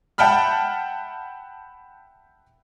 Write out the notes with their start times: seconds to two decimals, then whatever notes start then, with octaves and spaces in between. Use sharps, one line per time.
0.18 E5 F#5 G5 A5 B5 F6